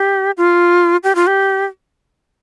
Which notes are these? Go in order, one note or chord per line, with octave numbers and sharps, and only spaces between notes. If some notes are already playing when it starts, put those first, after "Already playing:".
Already playing: G4
F4
G4
F4
G4